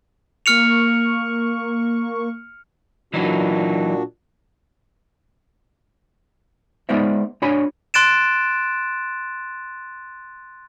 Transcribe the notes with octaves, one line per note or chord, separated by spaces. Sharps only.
A#3 C#6 F6 C#7 F7
A#2 E3 F#3 D4 D#4 F#4
G#3 B3 D#4 C5 D5 E5
D4 F#4 C#5 G#5 B5
C6 F#6 A6 D7 E7